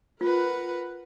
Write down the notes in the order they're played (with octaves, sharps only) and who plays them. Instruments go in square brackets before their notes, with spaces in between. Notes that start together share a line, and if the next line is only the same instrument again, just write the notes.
[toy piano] F4 [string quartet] A#4 B4 F#5